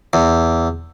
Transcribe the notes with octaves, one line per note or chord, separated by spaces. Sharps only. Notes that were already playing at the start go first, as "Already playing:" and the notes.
E2